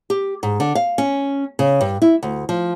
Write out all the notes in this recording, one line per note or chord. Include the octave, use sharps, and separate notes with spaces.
G4
G#2
D3
F5
C#4
C#3
G2
E4
D2
F3